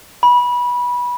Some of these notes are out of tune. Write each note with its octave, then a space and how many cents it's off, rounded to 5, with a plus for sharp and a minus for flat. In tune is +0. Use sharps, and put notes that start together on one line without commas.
B5 -20